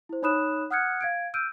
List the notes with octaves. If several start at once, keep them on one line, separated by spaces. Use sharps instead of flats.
E4 C5
D#4 C#5 B5 D#6 F#6 E7
F#5 D#6 F6 F#6 G#6 C#7
F5 G#6 D7
E6 F6 G6 D7 D#7